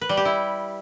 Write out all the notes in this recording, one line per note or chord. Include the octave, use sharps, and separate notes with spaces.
B4
G3
G4
E4